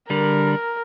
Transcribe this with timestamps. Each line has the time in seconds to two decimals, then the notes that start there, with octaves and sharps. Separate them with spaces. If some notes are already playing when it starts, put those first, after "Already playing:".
0.10 D3 G3 A#4